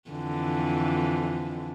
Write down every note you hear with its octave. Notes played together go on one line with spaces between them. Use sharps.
F2 D3 E3